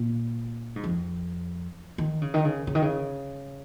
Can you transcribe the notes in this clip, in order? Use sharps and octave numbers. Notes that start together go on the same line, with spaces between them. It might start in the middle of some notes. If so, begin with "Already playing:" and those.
Already playing: A#2
G#2
F2
D#3
C#3
D#3
C#3
C#3
D#3
C#3